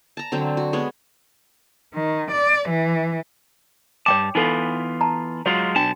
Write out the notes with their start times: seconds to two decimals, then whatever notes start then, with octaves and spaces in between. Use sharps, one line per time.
0.17 A5 A#5
0.32 D3 F#3 C4
0.57 F#4
0.73 G#3 B3 C#5
1.93 D#3
2.32 D5
2.69 E3
4.06 G2 F3 C#5 G5 A5 D6
4.35 E3 B3 D#4 F4 A4
5.01 A5 A#5
5.46 F#3 G#3 F4 F#4 C#5
5.76 B1 D4 F#4 G5 A5